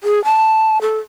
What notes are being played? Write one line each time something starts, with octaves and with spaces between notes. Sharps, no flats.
G#4
A5
A4